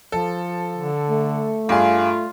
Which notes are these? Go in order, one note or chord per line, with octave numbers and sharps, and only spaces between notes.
F3 A4
D3
A3
G2 F4 G#4 F5